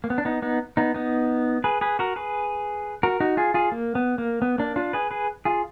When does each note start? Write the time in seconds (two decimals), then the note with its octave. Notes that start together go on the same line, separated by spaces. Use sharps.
0.04 A#3
0.10 B3
0.18 D4
0.25 B3 D#4
0.42 B3 D#4
0.77 B3 D#4
0.94 B3 D#4
1.64 G#4 B4
1.81 G#4 B4
1.99 F#4 A#4
2.16 G#4 B4
3.03 F#4 A#4
3.20 D#4 F#4
3.37 F4 G#4
3.54 F4 G#4
3.72 A#3
3.95 B3
4.18 A#3
4.42 B3
4.58 A#3 D4
4.76 D4 F4
4.93 G#4 B4
5.11 G#4 B4
5.45 F4 G#4